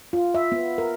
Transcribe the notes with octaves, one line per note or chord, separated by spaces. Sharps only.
F4
E5
B3
A#4